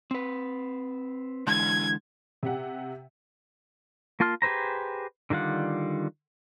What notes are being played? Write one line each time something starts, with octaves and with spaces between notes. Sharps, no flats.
C4 B4
D3 E3 G#3 G#6
C3 G4 F#5
A#3 F4 A5 C6 F6
G4 G#4 B4 C5 A#5
D3 D#3 G3 F4 F#5